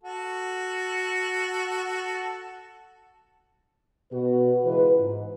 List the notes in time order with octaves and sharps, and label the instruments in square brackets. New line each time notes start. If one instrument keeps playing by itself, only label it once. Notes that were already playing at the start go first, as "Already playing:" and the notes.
[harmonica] F#4 A4
[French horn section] B2 F#4 B4
C#3 E3 G#3 F4 B4
G#2